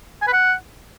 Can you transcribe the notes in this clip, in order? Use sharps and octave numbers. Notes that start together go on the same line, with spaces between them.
G#5
B4
F#5